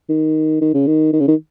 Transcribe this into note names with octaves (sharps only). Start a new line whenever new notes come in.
D#3
D#3
C#3
D#3
D#3
C#3
D#3